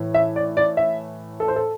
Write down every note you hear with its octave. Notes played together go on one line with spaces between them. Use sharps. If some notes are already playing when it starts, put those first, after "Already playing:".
Already playing: A2 E3
E5
D5
D5
E5
A4
C5
A4